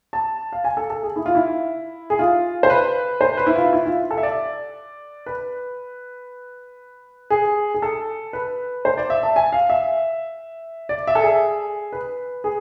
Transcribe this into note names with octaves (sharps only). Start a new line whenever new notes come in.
A5
F5
G#5
A4
A4
G#4
E4
F4
E4
G#4
F4
C5
B4
C5
B4
E4
F4
E4
F4
A4
E5
D5
B4
G#4
G#4
A4
B4
C5
D5
E5
A5
G#5
F5
E5
D5
E5
A4
G#4
B4
G#4